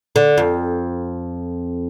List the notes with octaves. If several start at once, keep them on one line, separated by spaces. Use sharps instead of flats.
D3
F2